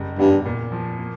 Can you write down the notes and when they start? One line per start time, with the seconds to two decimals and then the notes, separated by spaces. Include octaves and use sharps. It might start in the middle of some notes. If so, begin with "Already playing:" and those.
Already playing: F#1 G3
0.19 E2 G2
0.45 A#2
0.72 F3
0.98 A#3